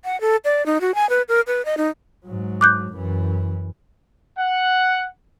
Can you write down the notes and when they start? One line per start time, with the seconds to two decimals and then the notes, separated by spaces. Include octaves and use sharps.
0.05 F#5
0.21 A4
0.45 D5
0.66 D#4
0.81 F#4
0.95 G#5
1.10 B4
1.29 A#4
1.47 B4
1.65 D#5
1.77 D#4
2.26 G#2 F#3
2.61 D6 F#6 G6
2.93 F#2 E3
4.37 F#5